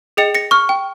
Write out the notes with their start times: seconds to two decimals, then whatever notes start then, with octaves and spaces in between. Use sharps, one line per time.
0.17 G#4 D#5 G5 C#7 F7
0.35 A#6 C#7
0.51 C#6 F6
0.69 G5